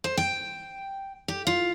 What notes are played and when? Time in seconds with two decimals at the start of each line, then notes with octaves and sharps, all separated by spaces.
0.04 C5
0.17 G5
1.28 G4
1.47 F4